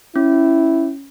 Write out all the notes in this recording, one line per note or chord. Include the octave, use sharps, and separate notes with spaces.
C#4 E4